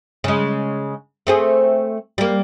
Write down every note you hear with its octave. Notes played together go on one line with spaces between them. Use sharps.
C#3 G#3
A3 C4 G#4
G3 A#3